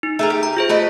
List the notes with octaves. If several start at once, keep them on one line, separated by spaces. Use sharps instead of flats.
D#4
A3 G#4 A#4
G4
A#5
F4 G#4 C5
A3 B4 D#5